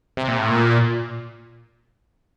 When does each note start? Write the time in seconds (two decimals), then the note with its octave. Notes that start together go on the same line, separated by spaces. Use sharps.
0.17 C3
0.28 A#2
0.39 A2
0.50 A#2